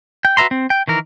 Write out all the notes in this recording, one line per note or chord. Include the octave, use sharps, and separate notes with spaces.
G5
F#4 B4 E5 A#5 C6
C4
G5
D#3 E3 A#4